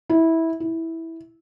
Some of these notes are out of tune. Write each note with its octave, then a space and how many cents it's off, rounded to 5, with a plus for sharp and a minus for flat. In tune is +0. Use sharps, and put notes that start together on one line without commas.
E4 -15
E4 -10